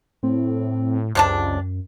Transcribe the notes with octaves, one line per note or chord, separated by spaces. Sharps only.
A2 C4
C#2 F#2 C3 D4 A5